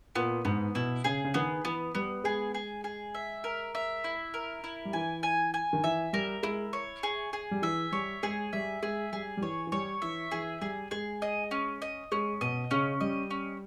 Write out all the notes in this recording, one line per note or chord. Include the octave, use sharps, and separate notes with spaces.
A#2 B3
G#2 B3
B2 E4
C#3 G#4
C#3
D#3 B3
E3 B3
G3 B3
G#3 G#4
G#4
G#4
E5
A#4
E5
E4
A#4
E4
G3
E3 G#5
G#5
G#5
D#3
E3 E5
G3 A#4
G#3 E4
C#5
G#4
G#4
G3
E3 E5
G3 C#5
G#3 G#4
G3 E5
G#3 G#4
G3 G#4
G3
E3 C#5
E3
G3 C#5
E3 E5
E3 G#4
G3 G#4
G#3 G#4
D#5
C#4
D#5
G#3 C#4
B2 D#5
C#3 C#4
G3 D#5
C#4